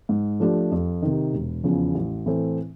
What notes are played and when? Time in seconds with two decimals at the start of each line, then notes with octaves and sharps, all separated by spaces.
0.09 G#2
0.40 F3 A3 D4 G4
0.72 F2
1.02 C3 D#3
1.33 E1
1.64 E2 C#3 F3
1.94 A1
2.26 A2 E3 A3 C4